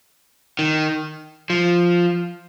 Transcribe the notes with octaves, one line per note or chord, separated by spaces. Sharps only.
D#3
F3